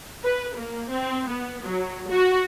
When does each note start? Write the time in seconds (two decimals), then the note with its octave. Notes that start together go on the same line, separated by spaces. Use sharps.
0.24 B4
0.55 A#3
0.89 C4
1.28 B3
1.63 F#3
2.09 F#4